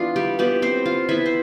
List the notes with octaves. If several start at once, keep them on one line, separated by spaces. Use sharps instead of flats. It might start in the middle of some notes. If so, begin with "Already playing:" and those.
Already playing: E3 B3 D4 F4
G3 G4
E3 G3 B3 G4
C4 C5
F4 F5
E3 B3 E4 E5
C5